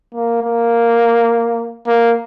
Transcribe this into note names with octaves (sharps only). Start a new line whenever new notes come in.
A#3
A#3
A#3